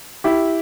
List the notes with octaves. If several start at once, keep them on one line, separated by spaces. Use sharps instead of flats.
E4 G4